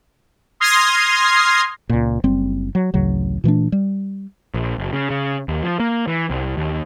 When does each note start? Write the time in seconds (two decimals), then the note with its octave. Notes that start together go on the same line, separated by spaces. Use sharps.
0.60 C6 D#6 F6 G#6 A#6 C7
1.89 C#2 A#2
2.24 F#1 G3 C4
2.75 F#3
2.94 A1 D2 C#3 F#3
3.44 A#2 E3 A3 D4
3.72 G3
4.54 A#1
4.78 F#1
4.93 C#3
5.10 C#3
5.48 D#2
5.63 F3
5.80 A#3
6.07 E3
6.30 C2
6.57 D#2